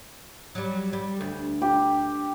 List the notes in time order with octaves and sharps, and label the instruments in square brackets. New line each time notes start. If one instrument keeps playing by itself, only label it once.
[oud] F#3 G3
G3
D2
[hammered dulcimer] G4